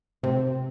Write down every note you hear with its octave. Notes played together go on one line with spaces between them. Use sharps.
C3 C4